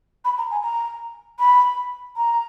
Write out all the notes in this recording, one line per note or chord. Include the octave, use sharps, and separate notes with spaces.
B5
A#5
G#5
A#5
B5
A#5